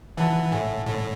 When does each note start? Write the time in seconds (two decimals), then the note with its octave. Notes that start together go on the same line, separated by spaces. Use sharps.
0.17 E3 F#5 A5
0.51 A2 E5 G#5
0.86 A2